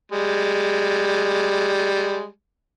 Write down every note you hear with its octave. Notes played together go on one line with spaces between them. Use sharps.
G3 G#3